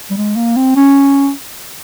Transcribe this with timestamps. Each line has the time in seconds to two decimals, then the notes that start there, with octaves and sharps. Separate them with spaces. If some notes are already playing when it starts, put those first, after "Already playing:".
0.10 G3
0.17 G#3
0.36 A#3
0.56 C4
0.76 C#4